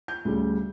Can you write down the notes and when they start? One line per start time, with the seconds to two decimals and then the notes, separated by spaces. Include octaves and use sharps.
0.08 G6
0.25 D2 C#3 G3